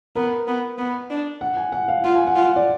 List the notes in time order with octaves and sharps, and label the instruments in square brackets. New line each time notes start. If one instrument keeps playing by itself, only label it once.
[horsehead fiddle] B3 [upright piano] A#4
[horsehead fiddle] B3
B3
D4
[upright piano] F#5
G#5
F#5
F5
[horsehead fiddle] F4 [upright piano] F#5
[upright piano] G#5
F#5
[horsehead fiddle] F4
[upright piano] D5